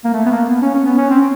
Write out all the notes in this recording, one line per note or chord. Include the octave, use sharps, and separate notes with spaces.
A#3
A3
B3
A#3
B3
C#4
C#4
B3
C#4
C4